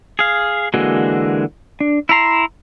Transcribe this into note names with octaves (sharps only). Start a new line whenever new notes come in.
G#4 F5
D3 E3 G#3 A#3 F#4
D4
E4 E5 A#5 C6